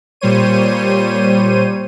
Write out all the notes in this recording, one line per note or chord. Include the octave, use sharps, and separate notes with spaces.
A#2 G3 C5 C#5 D#7